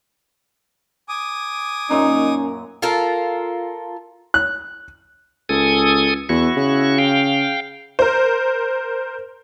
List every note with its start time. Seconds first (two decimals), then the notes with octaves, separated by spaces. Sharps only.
1.09 G#5 D6 D#6
1.90 F#2 A#2 C#4 D#4 A#5
2.82 F4 A4 A#4
4.34 F#6
5.49 C#2 A4 G#5 D#6
6.29 E2 E4 F#4 C#6
6.57 C#3
6.98 F5 G5
7.99 A#4 C5